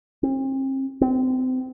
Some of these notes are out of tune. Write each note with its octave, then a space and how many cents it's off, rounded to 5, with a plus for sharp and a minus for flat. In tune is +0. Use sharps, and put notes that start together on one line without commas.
C4 +40
C4 -30